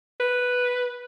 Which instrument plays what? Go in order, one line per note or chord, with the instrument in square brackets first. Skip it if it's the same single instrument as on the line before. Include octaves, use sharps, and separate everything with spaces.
[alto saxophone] B4